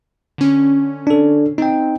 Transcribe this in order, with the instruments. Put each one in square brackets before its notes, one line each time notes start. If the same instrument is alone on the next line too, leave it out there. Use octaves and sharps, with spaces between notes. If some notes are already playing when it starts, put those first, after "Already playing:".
[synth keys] D3 C#4
[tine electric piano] D4 A4
[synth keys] C4 [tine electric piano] D#4 G5